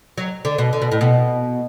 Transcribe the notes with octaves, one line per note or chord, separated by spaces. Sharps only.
F#3
D3
B2
D3
B2
A2
B2